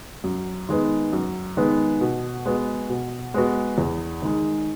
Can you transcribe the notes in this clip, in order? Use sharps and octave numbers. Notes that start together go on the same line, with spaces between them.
F#2
D#3 G#3 B3
F#2
D#3 G#3 B3
B2
G#3 B3 F#4
B2
G#3 B3 F#4
E2
D#3 G#3